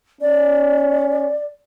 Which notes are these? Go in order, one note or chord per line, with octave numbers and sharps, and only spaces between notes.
C#4 D5